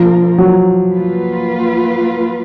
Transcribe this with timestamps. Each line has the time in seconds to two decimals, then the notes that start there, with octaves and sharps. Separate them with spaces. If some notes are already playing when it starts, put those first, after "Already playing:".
Already playing: B2 F3 A#3 D4 F4 A#4
0.38 F#3
0.96 A#3 F4 B4